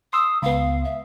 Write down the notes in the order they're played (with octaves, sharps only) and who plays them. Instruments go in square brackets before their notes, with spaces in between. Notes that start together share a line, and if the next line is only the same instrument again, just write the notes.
[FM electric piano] C6 E6 [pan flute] D#6
[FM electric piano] C#2 B3 [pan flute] F5
[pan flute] E5